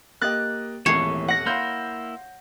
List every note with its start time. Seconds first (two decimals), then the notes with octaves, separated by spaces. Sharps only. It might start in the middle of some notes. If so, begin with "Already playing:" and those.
0.21 A#3 G4 D#5 F#6 A6
0.86 D#1 G#1 E3 A3 A#3 C#5 C7
1.28 F#5 A#6
1.46 A#3 E4 F5 C6 G6